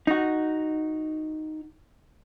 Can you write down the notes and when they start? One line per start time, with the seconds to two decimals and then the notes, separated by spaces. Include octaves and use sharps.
0.07 D#4 F#4